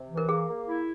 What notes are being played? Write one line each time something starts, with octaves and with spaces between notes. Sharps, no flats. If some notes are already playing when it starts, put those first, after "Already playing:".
Already playing: C3
E3
A#4
A#3 G#4
A#3
E4